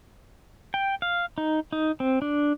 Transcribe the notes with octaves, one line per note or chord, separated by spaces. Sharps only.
G5
F5
D#4
D#4
C4
D4